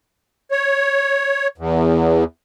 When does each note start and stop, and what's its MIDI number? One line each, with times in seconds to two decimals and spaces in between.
0.51 1.48 73
1.58 2.24 40